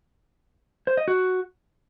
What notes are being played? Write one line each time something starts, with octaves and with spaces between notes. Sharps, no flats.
C5
D#5
F#4